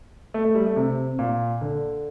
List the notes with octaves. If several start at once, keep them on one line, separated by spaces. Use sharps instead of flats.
A3
A3
G3
A3
C3
A#2
D3